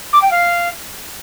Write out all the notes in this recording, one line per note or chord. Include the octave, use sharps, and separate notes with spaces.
D6
G5
F5